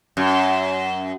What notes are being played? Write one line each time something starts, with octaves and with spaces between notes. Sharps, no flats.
F#2